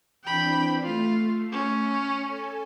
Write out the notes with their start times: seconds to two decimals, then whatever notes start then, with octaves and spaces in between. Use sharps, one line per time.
0.24 E3 C4 D4 G5 B5
0.83 A3 F4
1.52 C#4
2.26 A4 G#5